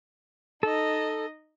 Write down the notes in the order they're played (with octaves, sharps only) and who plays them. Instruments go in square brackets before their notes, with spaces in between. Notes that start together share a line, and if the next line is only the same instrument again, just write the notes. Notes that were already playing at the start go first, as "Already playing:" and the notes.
[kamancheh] D#4 D#5 [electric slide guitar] A4